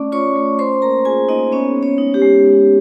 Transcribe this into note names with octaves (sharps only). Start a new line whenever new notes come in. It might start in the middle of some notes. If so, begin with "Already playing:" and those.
Already playing: A3 C#4 D5 D6
F4 C#5 C#6
A3
C#4 C5 C6
A#3 A#4 A#5
F4 G#4 G#5
A#3 D#4 D#5
B3 C#4 C#5
G#3
C#4 C#5
D#4
G4
G#3